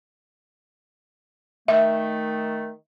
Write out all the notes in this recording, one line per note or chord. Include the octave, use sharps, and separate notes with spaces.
D#3 A3 E5